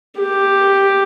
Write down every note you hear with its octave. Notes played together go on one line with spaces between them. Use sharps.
G4